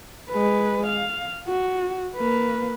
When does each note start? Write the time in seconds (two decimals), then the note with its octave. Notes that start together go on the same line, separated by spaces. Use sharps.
0.30 G#3 B4
0.86 F5
1.47 F#4
2.16 A#3 B4